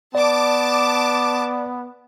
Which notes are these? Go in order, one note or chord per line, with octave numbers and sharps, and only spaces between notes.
B3 D5 A5 D6